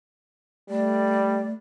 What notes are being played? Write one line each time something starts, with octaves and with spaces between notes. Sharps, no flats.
G3 A3 D5